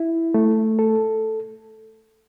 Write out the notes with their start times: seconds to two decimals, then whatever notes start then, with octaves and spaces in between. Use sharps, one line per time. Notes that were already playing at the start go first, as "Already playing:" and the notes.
Already playing: E4
0.34 A3
0.79 A4